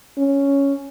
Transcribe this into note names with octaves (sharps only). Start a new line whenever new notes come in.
C#4